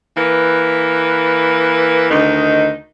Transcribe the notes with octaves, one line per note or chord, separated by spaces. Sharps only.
E3 A#3 B4
D2 D#3 D#4